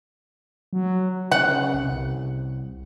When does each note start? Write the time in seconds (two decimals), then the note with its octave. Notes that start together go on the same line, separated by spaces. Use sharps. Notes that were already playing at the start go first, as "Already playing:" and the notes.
0.73 F#3
1.31 C#3 F#5
1.74 C2